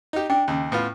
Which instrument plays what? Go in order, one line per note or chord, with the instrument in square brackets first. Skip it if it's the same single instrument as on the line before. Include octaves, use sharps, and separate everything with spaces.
[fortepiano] D#4 G4
[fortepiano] D4 [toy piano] G5
[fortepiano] D#2 C#3
A2 B3 F4